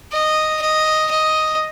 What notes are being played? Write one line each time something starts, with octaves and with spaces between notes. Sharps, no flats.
D#5
D#5
D#5